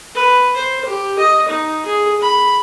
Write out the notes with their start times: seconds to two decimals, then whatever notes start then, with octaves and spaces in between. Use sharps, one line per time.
0.15 B4
0.56 C5
0.85 G4
1.18 D#5
1.48 D#4
1.86 G#4
2.21 B5